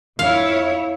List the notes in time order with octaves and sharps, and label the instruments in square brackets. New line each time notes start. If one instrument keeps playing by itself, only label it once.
[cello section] F2 E4 C#5 [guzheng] F5